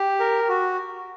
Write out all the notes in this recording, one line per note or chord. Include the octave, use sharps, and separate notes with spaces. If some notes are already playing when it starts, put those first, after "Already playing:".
Already playing: G4
A#4
F#4